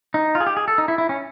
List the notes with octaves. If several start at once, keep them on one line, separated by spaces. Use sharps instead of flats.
D#4
F4
G#4
G4
G#4
A4
D#4
E4
E4
C#4